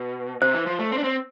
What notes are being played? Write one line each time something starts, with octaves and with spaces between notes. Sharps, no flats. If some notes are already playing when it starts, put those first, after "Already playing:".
Already playing: B2
C3 C5
E3
F3
A3
C4
D4
C4